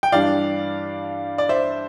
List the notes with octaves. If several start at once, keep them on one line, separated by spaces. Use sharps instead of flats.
G5
G2 E3 G3 D4 D5 F5
D5
C5 E5